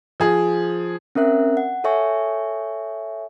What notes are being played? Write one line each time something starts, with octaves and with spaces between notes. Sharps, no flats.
F3 G#4
C4 C#4 A#4 E5 F#6
F#5
A4 C#5 E5 G#5 C#6